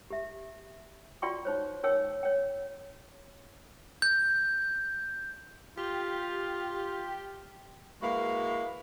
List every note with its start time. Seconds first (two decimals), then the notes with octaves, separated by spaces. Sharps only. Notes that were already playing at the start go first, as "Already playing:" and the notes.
0.10 G4 E5
1.22 F4 F#4 D5 G5 C6 C#6
1.45 D#4 C5 C#5
1.83 D#4 A#4 C#5 G5 E6
2.23 C#5 G5
4.02 G6
5.77 F4 G4
8.02 G#3 A#3 E4 F#4 B4 F5